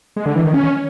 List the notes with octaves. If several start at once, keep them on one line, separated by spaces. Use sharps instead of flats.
G#3
D3
E3
D#3
C#4